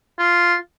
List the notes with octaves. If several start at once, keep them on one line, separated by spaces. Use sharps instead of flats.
F4